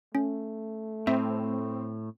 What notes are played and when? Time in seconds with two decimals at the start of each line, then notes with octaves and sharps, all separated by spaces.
0.15 A3 C#4
1.07 A2 C4 E5